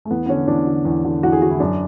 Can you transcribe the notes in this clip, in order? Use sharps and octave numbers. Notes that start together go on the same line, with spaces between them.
A3
E2 B3
B3
D3 C#4
E2 D4
D3
E2
D3
E2 F#4
G#4
D3 F#4
E4
F#2 D4